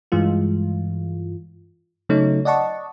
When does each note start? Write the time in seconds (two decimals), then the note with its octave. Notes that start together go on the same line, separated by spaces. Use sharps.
0.12 G2 E3 G#3 F4
2.09 C#3 F#3 A3 D#4 C#5
2.45 D5 D#5 F#5 A5 C#6